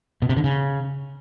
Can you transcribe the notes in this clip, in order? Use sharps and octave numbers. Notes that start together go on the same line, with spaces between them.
B2
C3
D3
C#3